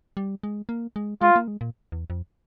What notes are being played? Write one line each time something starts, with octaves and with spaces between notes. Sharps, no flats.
G3
G#3
A#3
G#3
G#3 F4
A#3
G#3
A#2
E2
F2